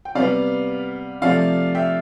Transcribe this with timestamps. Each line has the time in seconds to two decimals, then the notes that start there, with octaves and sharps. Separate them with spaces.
0.05 G5
0.15 C3 G3 B3 D5 F5
1.22 C3 F3 A3 D5 F5
1.75 E5 G5